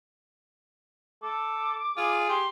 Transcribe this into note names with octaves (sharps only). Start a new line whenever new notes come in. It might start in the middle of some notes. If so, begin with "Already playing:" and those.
A4 D6
F4 G#4
G4 C6